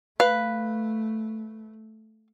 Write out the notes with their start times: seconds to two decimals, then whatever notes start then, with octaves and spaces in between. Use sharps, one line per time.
0.20 A3 B4 F5